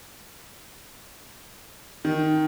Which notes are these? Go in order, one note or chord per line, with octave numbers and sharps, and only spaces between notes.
D#3